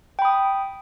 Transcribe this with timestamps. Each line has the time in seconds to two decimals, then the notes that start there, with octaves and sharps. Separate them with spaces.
0.19 G5
0.22 B5
0.25 D#6